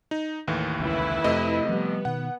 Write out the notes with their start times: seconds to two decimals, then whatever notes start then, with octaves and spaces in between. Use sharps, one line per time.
0.11 D#4
0.48 D#2 A2 E3
0.80 F1 C#2 C#3 E4 B4
1.24 F2 C3 F3 A3 D#5
1.69 F3 G3 B3
2.05 B2 D#3 F#5